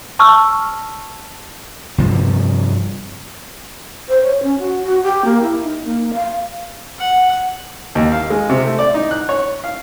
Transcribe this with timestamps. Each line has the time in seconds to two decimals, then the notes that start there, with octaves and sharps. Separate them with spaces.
0.19 A5 C#6 E6 F6
1.98 G2 C3 F3
4.08 C5
4.22 C#5
4.43 C#4
4.59 F#4
4.82 F#4
5.03 G4
5.25 A#3
5.42 E4
5.62 D#4
5.85 A#3
6.14 F5
6.99 F#5
7.95 D#2
8.12 F5
8.30 G#3
8.49 C3
8.64 A3
8.79 D5
8.94 D#4
9.11 F#6
9.29 C#5
9.64 F5